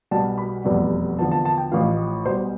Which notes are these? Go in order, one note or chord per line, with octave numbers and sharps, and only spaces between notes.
B1 B2 G3 A5
B5
F1 E2 B2 G3
E2 D3 F3 A5
A5
A5
G5
A1 A2 F3 F5
B1 B2 G3 C5